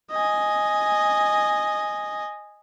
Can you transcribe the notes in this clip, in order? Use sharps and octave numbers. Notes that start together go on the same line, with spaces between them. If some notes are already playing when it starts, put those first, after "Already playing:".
D#5 G#5